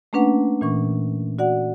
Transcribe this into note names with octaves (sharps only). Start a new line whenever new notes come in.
A3 A#3 C#4 D4 B4 F#5
A#2 E3 C#6
F#4 D5 F#5